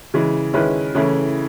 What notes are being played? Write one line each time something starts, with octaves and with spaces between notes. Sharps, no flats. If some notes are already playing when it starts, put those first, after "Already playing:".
C#3 E3 G#3
D#3 G#3 C#4 E4 B4
C#3 E3 A3 C#4 E4